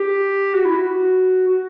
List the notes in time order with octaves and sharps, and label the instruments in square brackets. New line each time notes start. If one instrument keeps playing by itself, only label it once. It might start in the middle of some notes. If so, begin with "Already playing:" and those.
Already playing: [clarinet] G4
F#4
E4
F#4
F#4